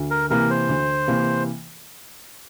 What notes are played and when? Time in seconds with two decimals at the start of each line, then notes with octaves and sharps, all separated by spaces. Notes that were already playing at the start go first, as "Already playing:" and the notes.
Already playing: D2
0.11 A#4
0.30 C3 E3 A#3 A#4
0.50 C5
0.69 D2
1.08 C3 E3 A#3